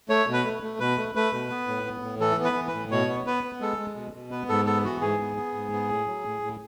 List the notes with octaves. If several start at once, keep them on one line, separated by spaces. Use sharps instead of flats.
A3 C#5
B2
B4
A3
A3
B2 B4
A3
A3 B4
B2
B3
A2
B3
A2
E3 A4
B3
B4
E3
B4
A2
B2 C#5
B3
B3 B4
B3
G#3 A4
G#3
B2
B2
B3 B4
G#2 A4
B3 A4
E3 F#4
G#2 G#4
B3
B3
G#2
B3
A2
F#3
A2
A2